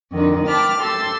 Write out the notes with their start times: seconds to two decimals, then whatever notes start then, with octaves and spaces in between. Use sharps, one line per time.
0.11 F2 D3 D#3
0.45 G5 A5 B5 D6 F6
0.77 G4 A4 A5 C6 E6